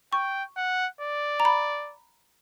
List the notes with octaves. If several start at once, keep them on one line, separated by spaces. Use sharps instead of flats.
G5 C#6
F#5
D5
A#5
B5